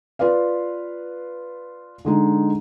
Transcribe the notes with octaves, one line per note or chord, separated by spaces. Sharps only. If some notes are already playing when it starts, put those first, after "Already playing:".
F4 B4 D5 F5
D3 G#3 D#4